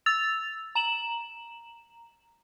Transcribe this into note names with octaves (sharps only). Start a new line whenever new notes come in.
E6 A6 F7
A#5 E7 F#7